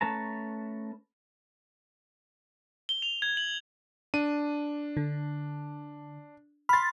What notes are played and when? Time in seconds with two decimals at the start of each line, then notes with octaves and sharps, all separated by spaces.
0.01 A3 C#4 B4 A5 A#5
2.89 G7
3.02 F7
3.22 G#6
3.37 F#7
4.14 D4 D#7
4.97 D3
6.69 B5 C6 F6 A6